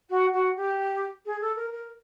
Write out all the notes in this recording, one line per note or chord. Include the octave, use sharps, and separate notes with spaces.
F#4
F#4
G4
G#4
A4
A#4
A#4